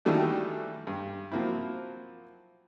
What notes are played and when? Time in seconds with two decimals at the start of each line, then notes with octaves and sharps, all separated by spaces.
0.05 D#3 E3 F#3 G3 A3 D4
0.87 G2
1.32 F3 F#3 A#3 C4 E4